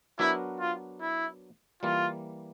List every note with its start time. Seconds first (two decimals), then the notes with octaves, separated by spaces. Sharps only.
0.19 F#3 B3 D4 E4 F#4 A#4
0.60 F4
1.01 E4
1.83 E3 G3 A#3 F4